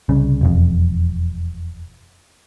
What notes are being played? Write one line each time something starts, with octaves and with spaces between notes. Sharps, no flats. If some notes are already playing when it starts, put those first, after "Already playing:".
C2 C#3
E1 F2